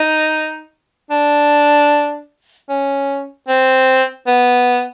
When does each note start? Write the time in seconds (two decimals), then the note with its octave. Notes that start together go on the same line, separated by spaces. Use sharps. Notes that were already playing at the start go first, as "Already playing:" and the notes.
Already playing: D#4
1.10 D4
2.69 C#4
3.48 C4
4.27 B3